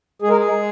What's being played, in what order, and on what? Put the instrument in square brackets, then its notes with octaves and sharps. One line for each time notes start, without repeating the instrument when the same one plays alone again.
[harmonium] G#3 G#4
A#4
G#4
G#3